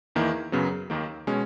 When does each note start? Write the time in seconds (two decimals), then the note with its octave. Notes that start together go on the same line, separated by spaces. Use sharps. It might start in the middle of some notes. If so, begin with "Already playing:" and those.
0.15 E2 D#3 A#3 E4
0.52 F#2 C#3 F#3 B3
0.90 D#2 D#3 A#3
1.27 B2 G#3 C#4